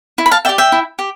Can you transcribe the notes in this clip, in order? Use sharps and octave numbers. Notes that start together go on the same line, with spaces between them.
E4
B5
F5 A5
G4 D5 E5 G5
E5 G5
E4
G4